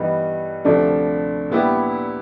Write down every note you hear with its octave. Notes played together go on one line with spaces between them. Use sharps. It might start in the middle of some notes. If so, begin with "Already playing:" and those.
Already playing: G2 E3 G3 B3 D#4
D2 C3 F3 A3 D4
A#2 G3 B3 E4 G4